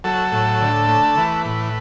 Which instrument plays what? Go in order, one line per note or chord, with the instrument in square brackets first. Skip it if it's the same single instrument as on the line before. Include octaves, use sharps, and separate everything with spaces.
[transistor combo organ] F#3 A4
A2
D3
A3
E3 B4
A2